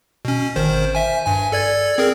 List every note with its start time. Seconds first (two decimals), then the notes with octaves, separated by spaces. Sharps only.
0.25 B2 C#4
0.56 G#1 D#3 C5
0.95 E5 G#5
1.26 G2 G#5
1.52 A4 D5 G#6
1.98 C4 G#4 A#4